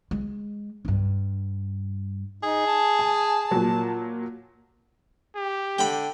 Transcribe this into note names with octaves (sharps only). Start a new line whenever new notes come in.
G#3
G2 D4
D#4 G#4
A5
G#5
A#2 F3 F#3
G4
D3 G5 B5